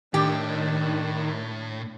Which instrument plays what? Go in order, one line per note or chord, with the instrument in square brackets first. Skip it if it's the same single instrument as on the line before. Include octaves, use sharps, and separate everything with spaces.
[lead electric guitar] A2 [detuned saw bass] D#3 [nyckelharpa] D4 [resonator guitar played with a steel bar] G4